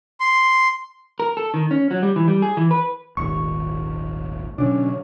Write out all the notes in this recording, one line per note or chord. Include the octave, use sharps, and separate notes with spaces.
C6
A#4
A4
D#3
C#4
F#3
G3
E3
G3
G#4
E3
B4
D#1 G#1 D#2 C#6
B2 D3 F#3 C#4 D4